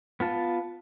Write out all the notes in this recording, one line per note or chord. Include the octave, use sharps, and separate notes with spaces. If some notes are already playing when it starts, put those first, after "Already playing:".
B3 F4 A5